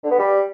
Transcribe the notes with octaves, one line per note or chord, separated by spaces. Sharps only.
D3
B3
G3